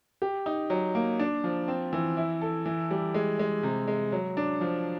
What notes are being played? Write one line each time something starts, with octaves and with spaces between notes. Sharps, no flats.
G4
D#4
F#3
A#3
D4
F3
C4
E3
E4
A4
E3
G3
G#3
G#3
C3
G#3
F#3
D4
F3